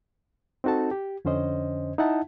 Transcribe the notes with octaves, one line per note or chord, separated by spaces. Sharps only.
C4 D#4 F#4 A4 A5
G4
F2 D3 C#4 C5 D#5
D#4 E4 E5 F#5 A5